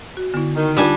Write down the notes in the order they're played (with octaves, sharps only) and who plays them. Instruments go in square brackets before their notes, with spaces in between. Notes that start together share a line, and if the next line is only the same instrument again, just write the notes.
[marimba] F#4
[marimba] D3 [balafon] B3 E4
[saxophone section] D#3
[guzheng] G3 D4 G#5 [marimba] D#4 [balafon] F4 G4